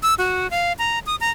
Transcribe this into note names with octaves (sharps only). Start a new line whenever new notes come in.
E6
F#4
F5
A#5
D#6
A#5